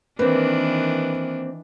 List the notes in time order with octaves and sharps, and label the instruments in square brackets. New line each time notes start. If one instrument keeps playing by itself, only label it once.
[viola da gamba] D#3 E3 D4 [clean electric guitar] A#3 C4 [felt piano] B4